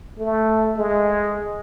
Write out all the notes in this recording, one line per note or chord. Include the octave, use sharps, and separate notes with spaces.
A3
G#3